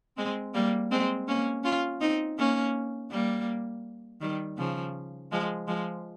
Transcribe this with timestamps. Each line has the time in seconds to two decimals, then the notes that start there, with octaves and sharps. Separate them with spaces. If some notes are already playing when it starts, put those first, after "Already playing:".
0.17 G#3 C4
0.54 G3 A#3
0.91 G#3 C4
1.28 A#3 C#4
1.64 C#4 F4
2.01 C4 D#4
2.38 A#3 C#4
3.11 G3 A#3
4.21 D#3 G3
4.58 C#3 F3
5.32 F3 G#3
5.67 F3 G#3